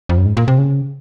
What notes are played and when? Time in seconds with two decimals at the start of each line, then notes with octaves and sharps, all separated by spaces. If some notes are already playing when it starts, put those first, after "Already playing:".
0.09 F2
0.18 F#2
0.25 G#2
0.37 A#2
0.48 C3
0.58 C#3